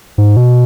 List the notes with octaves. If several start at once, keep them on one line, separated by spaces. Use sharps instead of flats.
G#2
B2